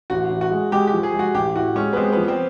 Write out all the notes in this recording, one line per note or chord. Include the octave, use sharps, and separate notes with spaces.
A1 F#4
A1
F#4
G#3
G#3 G4
G4
F3
G#4
G#3
F#4
A1 G4
A2 F#4
G#3 C#4
B3
G#3 C4
F3 B3
C4